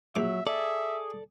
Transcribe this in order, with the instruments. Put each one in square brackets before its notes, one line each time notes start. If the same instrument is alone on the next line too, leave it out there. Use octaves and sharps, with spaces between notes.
[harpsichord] A#1 D6 [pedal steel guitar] F#3 [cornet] E5
[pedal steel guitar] G#4 [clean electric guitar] A4 D5 [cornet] E5